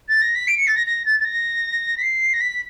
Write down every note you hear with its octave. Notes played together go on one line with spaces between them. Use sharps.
A6
A#6
B6
D7
C#7
A6
A#6
A#6
A6
A6
A#6
B6
C7
A#6
B6